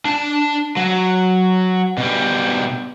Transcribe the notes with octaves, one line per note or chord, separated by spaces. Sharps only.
D4 A5
F#3
B2 G3